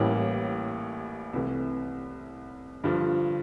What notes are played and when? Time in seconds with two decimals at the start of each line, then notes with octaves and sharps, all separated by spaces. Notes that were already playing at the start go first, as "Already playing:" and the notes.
Already playing: A1 A2 E3 G3 A#3
1.33 C2 C3 E3 A3
2.84 G2 D3 F3